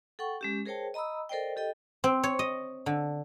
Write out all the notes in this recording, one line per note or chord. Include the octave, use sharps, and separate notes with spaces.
A4 F#5 G5 C#6
G#3 C#4 G4
G#4 A#4 C5 C#5 G5 A5
D#5 A#5 B5 D#6 E6
A4 A#4 C5 D5 D#5 G5
G4 A4 D#5 G5
C4
C#5
D#5
D3